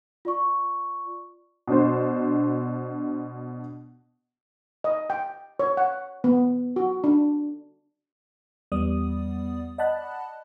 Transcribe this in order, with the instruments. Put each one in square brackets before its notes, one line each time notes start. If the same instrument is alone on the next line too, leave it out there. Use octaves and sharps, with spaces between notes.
[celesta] F4 D5 C#6
[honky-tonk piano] B2 D4 C5
[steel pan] D#5
G5
C#5
F#5
B3
F#4
D4
[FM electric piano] E2 G3 B3 D5 D#6
D5 D#5 F#5 A5 B5 F#6